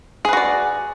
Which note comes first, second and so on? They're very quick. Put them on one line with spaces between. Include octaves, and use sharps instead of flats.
G#4 B4 F#4 D5